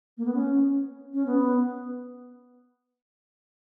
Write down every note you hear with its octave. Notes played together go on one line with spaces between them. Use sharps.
A#3
B3
C#4
C#4
B3